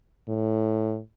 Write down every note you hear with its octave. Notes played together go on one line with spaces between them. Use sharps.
A2